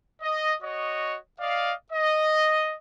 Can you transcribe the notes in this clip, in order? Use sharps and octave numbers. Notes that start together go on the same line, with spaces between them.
D#5
F#4 C#5 D#5
D5 D#5 F5
D#5